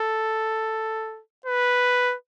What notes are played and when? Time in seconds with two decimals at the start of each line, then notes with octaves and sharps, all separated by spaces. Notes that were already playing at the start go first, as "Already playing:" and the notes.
Already playing: A4
1.46 B4